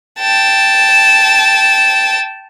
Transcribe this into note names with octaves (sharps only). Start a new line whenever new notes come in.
G5 A5